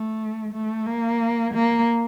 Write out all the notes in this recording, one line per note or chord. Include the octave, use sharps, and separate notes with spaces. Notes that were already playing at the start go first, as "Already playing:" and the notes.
Already playing: A3
A3
A#3
A#3